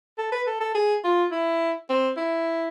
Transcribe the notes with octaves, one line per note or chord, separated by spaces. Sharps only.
A4
B4
A4
A4
G#4
F4
E4
C4
E4